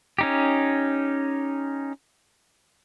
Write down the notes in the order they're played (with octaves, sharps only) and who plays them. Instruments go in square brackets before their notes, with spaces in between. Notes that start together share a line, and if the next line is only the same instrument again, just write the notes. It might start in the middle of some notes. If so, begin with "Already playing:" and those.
[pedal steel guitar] C#4 D#4 G4